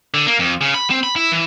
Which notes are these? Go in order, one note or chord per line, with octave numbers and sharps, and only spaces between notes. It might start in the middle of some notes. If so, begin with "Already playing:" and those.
D3
A#3
F2
C#3
B5
C4
B5
E4
E3